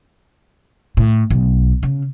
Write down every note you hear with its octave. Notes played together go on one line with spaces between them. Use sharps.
A2
B1
C#3